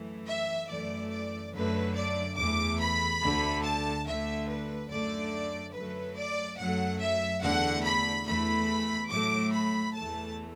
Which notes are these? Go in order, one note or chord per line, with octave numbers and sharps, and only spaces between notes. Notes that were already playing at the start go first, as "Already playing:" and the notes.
Already playing: F#2 E3 A3
E5
F#2 E3 A3 D5
D5
F#2 D3 F#3 A3 B4
D5
E2 E3 A3 D6
B5
D2 D3 A3
A5
D2 D3 A3 E5
B4
F#2 D3 A3 D5
F#2 F#3 A3 B4
D5
F#2 F#3 A3 F#5
E5
E2 D3 A3 F#5
B5
E2 E3 A3 B5
A2 F#3 A3 D6
B5
E2 E3 A3 A5